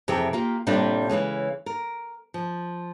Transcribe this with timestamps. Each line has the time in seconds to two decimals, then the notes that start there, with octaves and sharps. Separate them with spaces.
0.08 F2 C3 E3 G#4 A#4 G5
0.33 A#3 F4 G4
0.67 A2 C3 G3 A#3 D4 F4
1.09 C#3 E3 G#3 C#4
1.66 A#4
2.34 F3